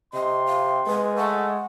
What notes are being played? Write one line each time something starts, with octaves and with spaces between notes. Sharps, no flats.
C3 D#5 C6
F5
G#3 B4
A3 F#5